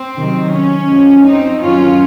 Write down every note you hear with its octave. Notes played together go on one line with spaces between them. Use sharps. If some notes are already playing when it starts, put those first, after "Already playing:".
Already playing: C4
C3 D#3 F#3
C#4
F#2 F3 G#3
C4 D#4
F#2 D#3 A#3 C#4 F4